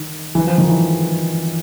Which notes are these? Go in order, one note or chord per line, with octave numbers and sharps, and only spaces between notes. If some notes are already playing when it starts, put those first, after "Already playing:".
Already playing: D#3
E3
F3
D#3
E3